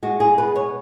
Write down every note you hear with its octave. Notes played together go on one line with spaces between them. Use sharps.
G#3 F#4
G#4
B2 B4
C#5